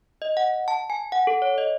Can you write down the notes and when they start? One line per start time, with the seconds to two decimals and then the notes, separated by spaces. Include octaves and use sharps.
0.22 D#5
0.37 F#5
0.68 A5
0.90 G#5
1.12 F#5
1.27 A4
1.42 C#5
1.58 D#5